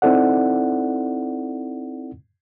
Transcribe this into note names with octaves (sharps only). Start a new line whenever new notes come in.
C4 D#4 E4 A4 D5 F#5